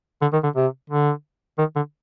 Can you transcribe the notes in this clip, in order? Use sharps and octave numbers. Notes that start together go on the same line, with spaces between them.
D3
D#3
D3
C3
D3
D#3
D3